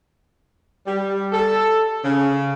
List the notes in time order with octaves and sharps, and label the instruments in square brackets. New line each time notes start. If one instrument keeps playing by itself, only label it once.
[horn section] G3
A4
C#3